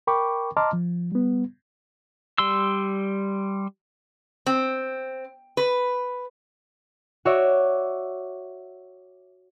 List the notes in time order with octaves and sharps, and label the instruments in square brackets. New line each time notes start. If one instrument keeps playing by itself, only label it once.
[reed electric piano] A#4 G5 B5 C#6 D6
D#5 A5 A#5 C6 D6 F6
F3
G3 B3
[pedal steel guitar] G3 C6 E6
[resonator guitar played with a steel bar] C4
B4
[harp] F#4 C#5 D5 E5